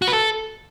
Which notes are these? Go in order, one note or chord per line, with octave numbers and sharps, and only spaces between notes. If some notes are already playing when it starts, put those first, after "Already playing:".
F#4
B4
A4